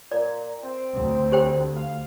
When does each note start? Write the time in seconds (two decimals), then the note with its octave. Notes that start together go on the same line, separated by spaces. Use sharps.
0.12 A#2 D5
0.63 C4
0.93 D2
1.32 G4 C5 G5
1.76 F5